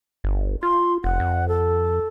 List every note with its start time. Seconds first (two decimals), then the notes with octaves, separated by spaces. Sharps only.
0.24 G1
0.63 F4 C6
1.04 F1 F#5
1.20 F2
1.48 A4